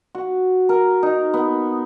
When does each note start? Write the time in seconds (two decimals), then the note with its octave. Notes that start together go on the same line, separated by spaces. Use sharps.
0.15 F#4
0.69 A#4
1.03 D#4
1.34 B3